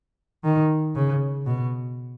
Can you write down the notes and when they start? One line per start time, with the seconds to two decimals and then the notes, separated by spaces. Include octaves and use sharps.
0.44 D#3
0.95 C#3
1.46 B2